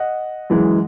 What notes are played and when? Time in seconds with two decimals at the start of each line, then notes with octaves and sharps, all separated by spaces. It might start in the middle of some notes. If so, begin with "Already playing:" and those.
Already playing: D#5 F#5
0.50 F#2 E3 G#3